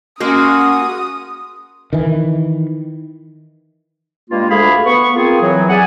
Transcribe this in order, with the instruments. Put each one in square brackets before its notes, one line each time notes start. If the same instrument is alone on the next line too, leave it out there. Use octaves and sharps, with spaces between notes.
[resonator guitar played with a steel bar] G#3 A#3 [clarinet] C#4 [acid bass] F#4 [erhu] D#6
[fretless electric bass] D#3 E3
[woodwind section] G2 G#3 A#3 F4
D2 A3 G#4 F5 B5
B3 C#6
A#3 C4 F4 G#4
E3 F#3
G#4 D5 E5 F#5 G#5